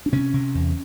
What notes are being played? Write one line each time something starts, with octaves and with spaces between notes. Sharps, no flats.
D4
C3 C#4
C3
E2